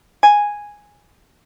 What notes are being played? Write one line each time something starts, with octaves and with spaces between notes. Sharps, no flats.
G#5